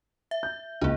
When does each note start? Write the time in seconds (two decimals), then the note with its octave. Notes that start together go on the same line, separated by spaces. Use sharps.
0.31 E5
0.43 G6
0.81 C#2 A#3 D4